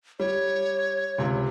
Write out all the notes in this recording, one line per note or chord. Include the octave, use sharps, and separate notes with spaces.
G3 C#5
C#2 C3